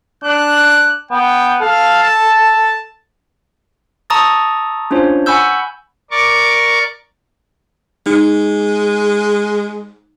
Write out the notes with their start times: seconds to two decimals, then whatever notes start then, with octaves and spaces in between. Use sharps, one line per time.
0.24 D4 F#6
1.11 B3 G5
1.61 A4 F5
2.03 A5
4.10 A5 A#5 C#6 D#6 E6 A6
4.91 C#4 D4 F4 C5 C#5
5.26 F#5 G#5 B5 C#6 E6 G6
6.11 A#4 D5 C#6 D6
8.06 G#3 D#4